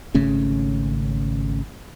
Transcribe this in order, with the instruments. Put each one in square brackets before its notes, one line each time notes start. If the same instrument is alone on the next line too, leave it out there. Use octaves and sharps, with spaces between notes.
[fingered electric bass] G#1 C#3 A3 C#4